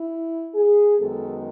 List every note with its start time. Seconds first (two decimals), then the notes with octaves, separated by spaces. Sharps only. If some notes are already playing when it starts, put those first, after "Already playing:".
Already playing: E4
0.54 G#4
0.98 F#2 D#3 G#3 B3 A4